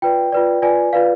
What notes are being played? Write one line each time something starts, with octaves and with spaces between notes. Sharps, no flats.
F4 B4 D5 G5
F4 B4 D5
F4 B4 D5 G#5
F4 B4 D5 F5